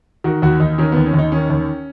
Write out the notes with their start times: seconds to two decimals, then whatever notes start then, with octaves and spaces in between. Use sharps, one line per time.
0.24 D#3 F#4
0.42 D#2 F#4
0.60 D#2 D#4
0.78 D#3 C#4
0.92 D#2 B3
1.06 C#4
1.13 D#2
1.18 D#4
1.32 D#3 C#4
1.50 D#2